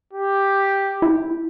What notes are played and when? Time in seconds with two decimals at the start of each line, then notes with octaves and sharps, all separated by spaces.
0.13 G4
1.02 E4